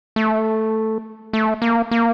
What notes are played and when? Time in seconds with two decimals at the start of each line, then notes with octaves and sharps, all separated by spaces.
0.16 A3
1.33 A3
1.62 A#3
1.91 A#3